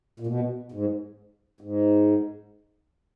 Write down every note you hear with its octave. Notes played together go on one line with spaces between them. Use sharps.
A#2
B2
G#2
G#2